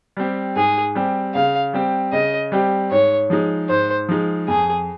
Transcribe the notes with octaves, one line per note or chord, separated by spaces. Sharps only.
G3 C4 G4
G#2 G#4
G3 C4 G4
C#3 F5
G3 C4 G4
C#3 D#5
G3 C4 G4
G#2 C#5
F3 G#3 D#4
G#2 C5
F3 G#3 D#4
F2 G#4